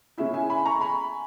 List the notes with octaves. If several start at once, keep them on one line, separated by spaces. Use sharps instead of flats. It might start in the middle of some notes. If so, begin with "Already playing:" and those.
C#3 G#3 C#4 E4 E5
E5 G#5
G#5 B5
A#5 C#6
G#5 B5